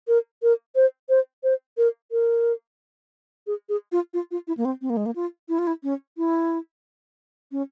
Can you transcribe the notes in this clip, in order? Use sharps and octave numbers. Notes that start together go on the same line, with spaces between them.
A#4
A#4
C5
C5
C5
A#4
A#4
G#4
G#4
F4
F4
F4
E4
A#3
C4
C4
A#3
G#3
A#3
F4
E4
F4
E4
C#4
E4
C#4